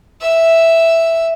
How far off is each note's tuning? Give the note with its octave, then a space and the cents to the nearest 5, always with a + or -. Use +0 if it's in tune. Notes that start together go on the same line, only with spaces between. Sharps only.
E5 +0 E6 +0